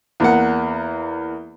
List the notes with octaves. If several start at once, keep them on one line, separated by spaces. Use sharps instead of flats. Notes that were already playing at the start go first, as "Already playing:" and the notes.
E2 A#3 F#5